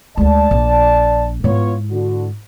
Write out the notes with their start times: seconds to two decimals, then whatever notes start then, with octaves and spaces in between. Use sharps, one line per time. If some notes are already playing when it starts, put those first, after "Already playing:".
0.17 D2 G#3 D5 A5
0.51 A#1
1.44 G#2 B3 E4 F4 C#5
1.91 D3 F#4